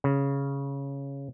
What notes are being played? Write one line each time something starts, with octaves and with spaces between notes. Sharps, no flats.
C#3